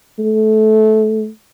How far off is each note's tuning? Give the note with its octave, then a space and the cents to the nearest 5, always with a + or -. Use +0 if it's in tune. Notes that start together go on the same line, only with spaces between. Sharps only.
A3 -20